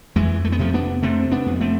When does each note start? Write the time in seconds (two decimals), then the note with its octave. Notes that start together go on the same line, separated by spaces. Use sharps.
0.16 F2 E3 G#3
0.45 A3
0.52 B3
0.59 C3 F3 A3
0.74 B3 D4
1.03 C3 A3 C4
1.31 B3 D4
1.46 F2
1.61 A3 C4